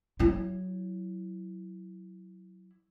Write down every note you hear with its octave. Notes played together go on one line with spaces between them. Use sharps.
F#3 E4